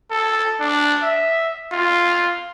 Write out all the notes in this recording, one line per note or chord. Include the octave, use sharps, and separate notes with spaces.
A4
D4
E5
F4